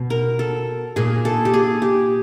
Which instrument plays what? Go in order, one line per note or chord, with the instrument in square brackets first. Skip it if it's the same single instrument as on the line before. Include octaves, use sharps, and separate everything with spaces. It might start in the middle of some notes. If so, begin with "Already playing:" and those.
Already playing: [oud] B2
[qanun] A#4
A4
[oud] A#2 [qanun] G#4
[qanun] A4
G4
G#4
G4